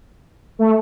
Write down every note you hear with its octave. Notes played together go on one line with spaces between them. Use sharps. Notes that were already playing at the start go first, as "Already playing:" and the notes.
A3